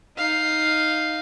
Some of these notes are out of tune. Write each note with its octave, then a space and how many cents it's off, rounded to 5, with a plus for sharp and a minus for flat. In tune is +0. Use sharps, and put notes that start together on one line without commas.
D#4 +0 F5 +0